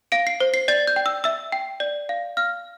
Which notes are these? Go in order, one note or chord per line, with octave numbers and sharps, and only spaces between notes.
F5 D7
C7
C5
C7
D5 A6
G6
G5
E6
E5 E6
G5
D5
F5
F5 F6